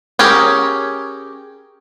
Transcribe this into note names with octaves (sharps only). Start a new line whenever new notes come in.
C#4 G4 G#4 A#4